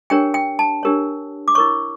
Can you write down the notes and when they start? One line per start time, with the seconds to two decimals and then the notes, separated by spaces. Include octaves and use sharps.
0.10 D4 G4 A#4 C#5 G5
0.34 G5
0.59 A5
0.83 D4 G4 A#4 C#5
1.48 D6
1.55 E4 A#4 C#5 C#6